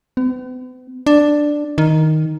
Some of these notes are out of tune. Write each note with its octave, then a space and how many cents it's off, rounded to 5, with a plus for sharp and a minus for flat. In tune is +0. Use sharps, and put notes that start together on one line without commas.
B3 +45
D4 +5
D#3 +5